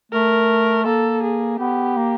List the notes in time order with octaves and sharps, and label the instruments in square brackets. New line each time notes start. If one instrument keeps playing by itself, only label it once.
[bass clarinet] A3 [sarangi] A#4
[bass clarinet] A#3 [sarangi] A4
[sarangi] G#4
[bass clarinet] B3 [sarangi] G4
[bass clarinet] A#3